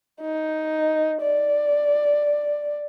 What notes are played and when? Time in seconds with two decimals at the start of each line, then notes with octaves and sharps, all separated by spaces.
0.21 D#4
1.22 D5